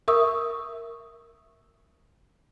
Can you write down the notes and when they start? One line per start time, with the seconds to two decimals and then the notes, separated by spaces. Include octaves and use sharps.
0.08 A#4 E5 C#6 D#6 E6